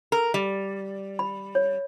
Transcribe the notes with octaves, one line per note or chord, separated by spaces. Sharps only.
A#4
G3
B5
C#5